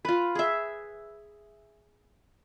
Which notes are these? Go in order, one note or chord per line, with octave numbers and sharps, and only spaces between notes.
F4 B4
G#4 E5